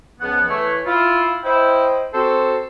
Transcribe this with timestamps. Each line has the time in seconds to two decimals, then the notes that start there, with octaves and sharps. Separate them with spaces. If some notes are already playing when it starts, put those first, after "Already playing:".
0.20 C#2 F3 B3 F#5
0.48 E3 A3 B4 C#5
0.86 E4 F4
1.44 E4 C5 D#5 G5
2.14 C4 F#4 A4 C5